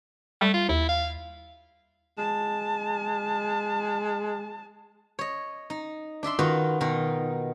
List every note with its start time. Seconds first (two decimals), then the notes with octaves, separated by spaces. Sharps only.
0.41 G3 A3
0.54 F4
0.69 D#2 E4
0.89 F5
2.18 G#3 A5
5.19 C#5 D#5
5.70 D#4
6.23 D4 D5 E5 C6
6.39 D#3 F4 F#4 B4 D#5
6.81 B2 D#3 D#4